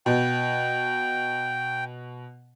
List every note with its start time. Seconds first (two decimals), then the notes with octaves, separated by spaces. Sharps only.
0.06 B2 G5